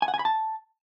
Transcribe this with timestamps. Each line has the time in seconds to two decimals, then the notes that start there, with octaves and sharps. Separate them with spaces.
0.02 G#5
0.08 F#5
0.14 G#5
0.19 B5
0.25 A5